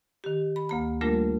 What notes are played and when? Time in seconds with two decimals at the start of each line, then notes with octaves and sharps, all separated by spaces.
0.24 D#3 G4
0.56 B5
0.69 D2 A#3 A#5
1.01 G3 A3 A#3 D4 F4 A#4